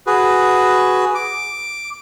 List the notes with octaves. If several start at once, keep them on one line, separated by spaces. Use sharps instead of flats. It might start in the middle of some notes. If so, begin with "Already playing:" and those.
F#4 G#4 B4
D6